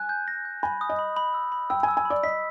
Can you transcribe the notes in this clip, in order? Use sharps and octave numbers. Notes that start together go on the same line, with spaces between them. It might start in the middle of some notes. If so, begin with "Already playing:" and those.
Already playing: G#5 F#6
G6
A#6
G6
G#5 B5
D#6
D#5
B5
B5
E6
B5
G5 E6
G#5
E6
G#5
D5 B5
D#5 B6